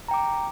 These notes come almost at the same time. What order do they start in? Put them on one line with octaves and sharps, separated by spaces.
A#5 G5 D6